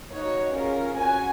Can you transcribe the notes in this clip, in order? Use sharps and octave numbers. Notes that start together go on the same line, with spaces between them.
A#3 D#4 F#4 C#5
C#4 F4 G#4 A#4
C#4 F#4 G#5